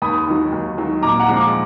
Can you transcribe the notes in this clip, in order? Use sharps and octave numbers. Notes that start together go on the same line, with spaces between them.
D#2 B5 D#6
D#3 F#3
D#2
D#3 F#3
A#2 A#5 D6
F#5 A#5
F3 G#3
A#5 D6